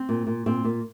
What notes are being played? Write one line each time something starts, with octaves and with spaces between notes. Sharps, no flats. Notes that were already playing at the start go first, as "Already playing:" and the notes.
Already playing: C4
A#2
A#2
A#2 C4
A#2